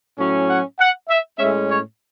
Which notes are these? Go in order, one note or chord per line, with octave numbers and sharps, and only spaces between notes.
A2 F#3 C#4
F#5
F#5
E5
A2 G#3 C#4 E5
C#5